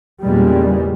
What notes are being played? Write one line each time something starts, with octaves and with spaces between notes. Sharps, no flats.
E2 A#2 C#3 G3 G#3